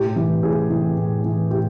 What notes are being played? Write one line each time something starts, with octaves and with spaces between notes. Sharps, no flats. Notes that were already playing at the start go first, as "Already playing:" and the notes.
Already playing: A2 G4
E3
A2 G#4
E3
A2
E3
A2 G4